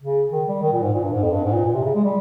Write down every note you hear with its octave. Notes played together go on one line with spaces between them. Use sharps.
C#3
D#3
G3
D#3
A#2
G#2
A#2
G2
G#2
F2
G2
G#2
A#2
A#2
C3
C#3
G#3
G3